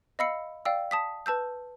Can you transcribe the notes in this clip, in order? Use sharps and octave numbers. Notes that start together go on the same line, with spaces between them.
D#5 F5 B5 E6 C7 C#7
D5 F5 G5 E6
A5 D#6 B6
B4 A5 E6 G6